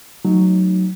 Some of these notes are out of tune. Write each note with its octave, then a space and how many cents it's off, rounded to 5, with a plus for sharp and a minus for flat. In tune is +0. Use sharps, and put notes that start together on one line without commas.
F#3 +0 A3 +0 D#4 +0